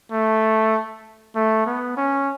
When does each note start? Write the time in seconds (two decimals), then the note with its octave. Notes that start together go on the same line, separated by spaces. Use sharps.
0.12 A3
1.36 A3
1.66 B3
1.97 C#4